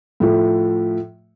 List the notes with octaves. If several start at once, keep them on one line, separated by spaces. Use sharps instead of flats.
A2 F3 A3